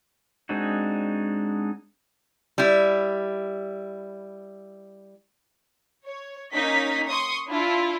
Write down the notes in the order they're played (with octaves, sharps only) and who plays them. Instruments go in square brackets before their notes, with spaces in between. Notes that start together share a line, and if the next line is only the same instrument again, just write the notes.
[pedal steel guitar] G#3 C4 D4 D#4 F#4
[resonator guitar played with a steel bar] G3 E4
[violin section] C#5
A#3 C#4 D#4 D#5 B6
C6 C#6 D#6
D4 E4 F4